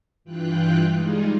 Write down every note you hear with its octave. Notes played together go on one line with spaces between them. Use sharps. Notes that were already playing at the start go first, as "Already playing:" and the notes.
G2 E3 F4 G5 F#6
G3 G#3 D#4 F4 G#4